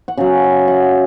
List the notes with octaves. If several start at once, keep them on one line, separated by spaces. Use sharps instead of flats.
F#5
C#3 F#3 F5
E5
F#5